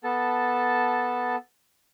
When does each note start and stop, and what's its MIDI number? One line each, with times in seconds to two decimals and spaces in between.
0.04 1.36 59
0.04 1.36 69
0.04 1.36 81